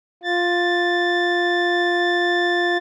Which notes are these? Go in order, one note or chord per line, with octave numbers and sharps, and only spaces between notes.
F4 A6